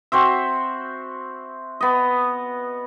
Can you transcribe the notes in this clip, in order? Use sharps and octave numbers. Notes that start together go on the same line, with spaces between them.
C4 F#4 C5 E5
B3 D#5